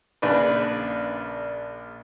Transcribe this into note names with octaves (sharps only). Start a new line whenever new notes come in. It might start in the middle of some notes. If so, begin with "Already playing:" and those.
A#1 C#3 D4 B4